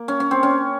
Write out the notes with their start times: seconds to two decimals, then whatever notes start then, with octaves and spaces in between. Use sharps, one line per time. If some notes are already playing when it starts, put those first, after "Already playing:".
Already playing: A#3
0.08 C#4
0.20 C#4
0.31 C4
0.43 C#4